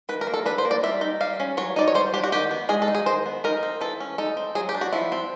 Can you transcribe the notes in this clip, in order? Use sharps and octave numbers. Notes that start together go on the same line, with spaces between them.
D#3 B4
A#4
A#3
A4
D4 B4
C5
A#3
D5
G3 E5
D#4
G3 F5
C#4
F#3 C#5
D#4 D5
C#5
G3 C5
D4 G4
F#4
D#3 G4
B3
G#3 G#4
A4
D#4
G#4
D#3 C5
B3
D#4 A#4
C4
E3 A4
C#4
D#4 A4
C4
F#3 G#4
G4
D4
F#4
F3 E4
C4